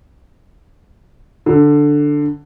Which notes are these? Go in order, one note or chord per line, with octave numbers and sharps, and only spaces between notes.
D3